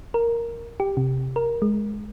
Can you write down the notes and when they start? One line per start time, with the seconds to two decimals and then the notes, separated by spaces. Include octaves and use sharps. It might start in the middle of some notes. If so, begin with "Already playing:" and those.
0.14 A#4
0.80 G4
0.97 C3
1.36 A#4
1.62 G#3